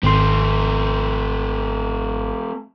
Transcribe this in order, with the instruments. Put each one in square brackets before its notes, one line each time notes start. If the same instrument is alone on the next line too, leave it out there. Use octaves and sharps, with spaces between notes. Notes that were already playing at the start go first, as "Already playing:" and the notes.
[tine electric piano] G#1 C6 [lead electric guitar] A3 C4